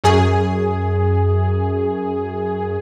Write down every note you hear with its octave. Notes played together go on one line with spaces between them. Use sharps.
F#2 G#4